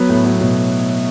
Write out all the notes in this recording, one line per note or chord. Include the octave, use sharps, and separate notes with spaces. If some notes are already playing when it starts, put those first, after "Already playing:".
Already playing: F#3 B3
A2
F#3
B2